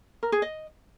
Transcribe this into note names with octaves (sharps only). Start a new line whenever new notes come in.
A#4
G#4
D#5